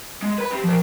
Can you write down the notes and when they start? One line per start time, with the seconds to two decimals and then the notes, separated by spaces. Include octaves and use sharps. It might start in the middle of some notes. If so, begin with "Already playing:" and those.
0.22 G#3
0.38 B4 B5
0.51 C4 G4
0.64 F3 A#4